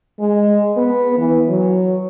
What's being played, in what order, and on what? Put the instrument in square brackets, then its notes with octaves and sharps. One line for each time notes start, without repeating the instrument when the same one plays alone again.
[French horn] G#3
B3
E3
F#3